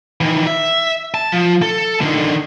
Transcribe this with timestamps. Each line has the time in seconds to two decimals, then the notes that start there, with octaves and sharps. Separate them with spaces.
0.21 D#3 E3
0.47 E5
1.14 A5
1.32 F3
1.62 A4
2.01 D3 D#3